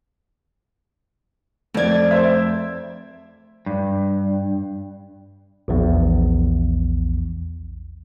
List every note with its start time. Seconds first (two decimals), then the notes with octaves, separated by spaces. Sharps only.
1.74 F2 A3 D5 G#6
2.11 C5 E5
3.66 G2
5.68 A#1 E2